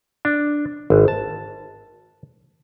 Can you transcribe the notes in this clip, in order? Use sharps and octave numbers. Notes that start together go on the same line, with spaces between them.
D4
G#1
A5